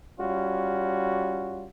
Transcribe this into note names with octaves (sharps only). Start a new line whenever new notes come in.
G3 C#4 F4 F#4